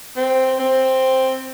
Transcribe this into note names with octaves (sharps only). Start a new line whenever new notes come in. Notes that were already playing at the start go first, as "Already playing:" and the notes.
C4
C4